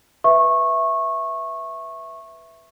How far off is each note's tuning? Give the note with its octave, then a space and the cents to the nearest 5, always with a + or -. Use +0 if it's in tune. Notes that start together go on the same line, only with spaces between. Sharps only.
B4 +0 E5 +0 C#6 -20